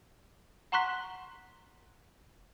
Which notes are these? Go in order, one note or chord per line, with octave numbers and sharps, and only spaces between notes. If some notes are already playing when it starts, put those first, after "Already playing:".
F#5 A#5 C6 C#6 F#6 B6